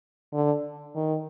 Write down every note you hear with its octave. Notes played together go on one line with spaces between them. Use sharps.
D3
D#3